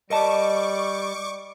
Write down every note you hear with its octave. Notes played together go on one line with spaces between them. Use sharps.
G3 A#4 D#5 A5 C#6 D6